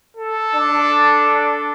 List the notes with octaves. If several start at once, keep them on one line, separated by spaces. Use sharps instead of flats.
A4
D4